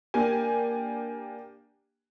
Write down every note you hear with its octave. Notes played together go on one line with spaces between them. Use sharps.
A#3 D4 G4 G#5